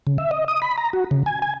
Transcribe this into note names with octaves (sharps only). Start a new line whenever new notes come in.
C#3
E5
D#5
D#6
B5
A#5
F#4
C#3
G#5
G#5